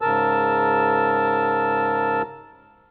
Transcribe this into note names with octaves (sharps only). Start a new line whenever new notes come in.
G#2 C#3 A#4 A5 E6